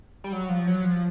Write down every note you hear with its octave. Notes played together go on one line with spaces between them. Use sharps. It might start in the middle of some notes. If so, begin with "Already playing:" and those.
G3
F#3
F3
F#3
F3